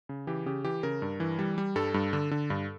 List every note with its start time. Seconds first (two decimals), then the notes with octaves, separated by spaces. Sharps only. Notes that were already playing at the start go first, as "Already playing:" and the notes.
0.09 C#3
0.27 E3 G4
0.46 C#3 G4
0.64 E3 G4
0.83 C#3 A#4
1.02 G2
1.20 E3
1.39 G3
1.58 G3
1.76 G2 A4
1.94 G2
2.13 D3
2.31 D3
2.50 G2